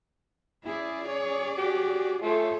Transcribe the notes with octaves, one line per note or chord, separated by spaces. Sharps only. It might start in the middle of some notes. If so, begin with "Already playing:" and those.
C#4 E4 G#4 D5
C#5
F#4 G4
A3 F4 G#4 A4 C5 C#5